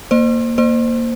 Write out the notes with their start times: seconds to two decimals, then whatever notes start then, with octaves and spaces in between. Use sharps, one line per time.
0.11 A#3 C5
0.58 A#3 C5